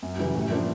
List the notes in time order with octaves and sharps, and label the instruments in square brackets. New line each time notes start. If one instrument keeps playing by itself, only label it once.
[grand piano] F#2
C#3 E3 G3
A2
F3 A#3 D4